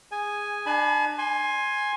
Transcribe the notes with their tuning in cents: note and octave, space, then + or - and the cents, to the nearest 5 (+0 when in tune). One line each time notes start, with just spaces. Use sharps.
G#4 -15 G#5 +0
D4 +30 G#5 +45 B5 +0
G#5 +0 C6 +20